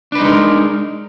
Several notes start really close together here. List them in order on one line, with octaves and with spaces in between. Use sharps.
D4 B4 D#4 G#3 A#4